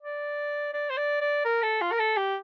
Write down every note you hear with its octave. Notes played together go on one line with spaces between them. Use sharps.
D5
D5
C5
D5
D5
A#4
A4
F4
A#4
A4
G4